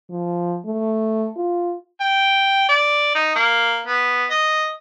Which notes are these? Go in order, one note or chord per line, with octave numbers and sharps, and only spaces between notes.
F3
A3
F4
G5
D5
D#4
A#3
B3
D#5